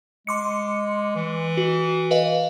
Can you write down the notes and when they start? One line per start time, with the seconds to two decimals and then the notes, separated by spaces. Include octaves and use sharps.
0.27 G#3 C6 D6 C#7
1.16 E3
1.57 F#4
2.11 B4 D#5 F5